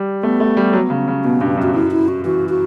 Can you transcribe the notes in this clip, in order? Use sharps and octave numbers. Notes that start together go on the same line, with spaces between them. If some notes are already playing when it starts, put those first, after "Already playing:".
Already playing: G3
A3 B3
A3
G3
F#3
C#3
C#3
B2 B3
G2 D4
F#2
F#4
F#2 E4
E4
F#4
E3 F#4
F#4